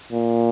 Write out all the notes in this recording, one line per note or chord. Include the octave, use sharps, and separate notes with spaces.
A#2